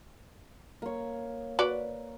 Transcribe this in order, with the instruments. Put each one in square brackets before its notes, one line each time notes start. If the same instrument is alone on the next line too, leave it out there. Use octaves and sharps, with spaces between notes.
[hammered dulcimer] A#3 C#5
[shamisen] F#4 B4 D5